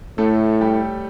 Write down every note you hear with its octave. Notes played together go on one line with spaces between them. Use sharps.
A2 A3 A4
G3 G4